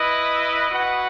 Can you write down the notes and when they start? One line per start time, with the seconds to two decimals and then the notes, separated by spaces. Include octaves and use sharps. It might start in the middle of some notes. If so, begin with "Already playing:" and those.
Already playing: E4 B4 D#5
0.70 F#4 B4 F#5